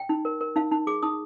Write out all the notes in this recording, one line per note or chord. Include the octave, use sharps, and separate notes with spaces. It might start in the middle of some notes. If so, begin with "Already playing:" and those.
Already playing: G5
D#4
A#4
A#4
D#4 F5
D#4
G#4 D6
D#4 D#6